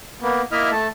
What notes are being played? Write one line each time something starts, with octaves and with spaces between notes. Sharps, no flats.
A#3 B3
A#3 E4 D#5 E5 F6
A3 A5